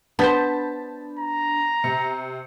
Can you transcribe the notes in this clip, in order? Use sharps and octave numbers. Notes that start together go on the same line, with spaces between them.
B3 D4 C5 A5 B5 G6 B6
A#5
C3 C#7